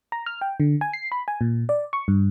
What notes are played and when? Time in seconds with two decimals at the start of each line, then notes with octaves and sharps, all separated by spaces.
0.12 A#5
0.26 F6
0.41 G5
0.60 D3
0.81 G#5
0.93 C7
1.12 B5
1.28 G#5
1.41 A#2
1.69 D5
1.93 C#6
2.08 G2